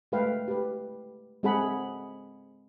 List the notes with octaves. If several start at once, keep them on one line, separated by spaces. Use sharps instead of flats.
G#3 A3 A4 B4 F5 G5
G4 B4
G#3 C4 G#4 A4 F#5 B5